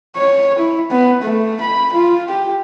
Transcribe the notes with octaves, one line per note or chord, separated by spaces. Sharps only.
C#5
E4
B3
A3
B5
F4
G4